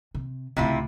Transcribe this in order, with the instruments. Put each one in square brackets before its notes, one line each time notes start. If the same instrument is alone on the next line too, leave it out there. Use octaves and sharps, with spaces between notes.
[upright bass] C3
[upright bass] C#2 A2 [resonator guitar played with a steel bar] C3 E4 F4